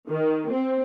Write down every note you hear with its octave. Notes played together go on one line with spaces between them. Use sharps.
D#3
C4